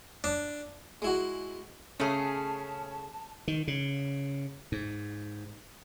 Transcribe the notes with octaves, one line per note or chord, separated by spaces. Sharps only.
D4
G#3 E4 F#4
C#3 A3 C#4 G#4 A5
D#3
C#3
G#2